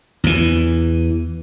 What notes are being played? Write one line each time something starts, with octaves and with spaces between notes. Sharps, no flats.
E2 E3